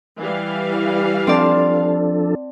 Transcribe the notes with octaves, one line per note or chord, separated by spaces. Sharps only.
E3 G3 F5
F3 C4 D4 A4 D5 A5